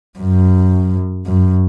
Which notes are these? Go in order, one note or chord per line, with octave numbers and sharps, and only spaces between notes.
F#2
F#2